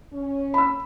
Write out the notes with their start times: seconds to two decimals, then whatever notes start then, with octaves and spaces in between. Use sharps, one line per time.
0.13 C#4 C#5
0.54 B5 E6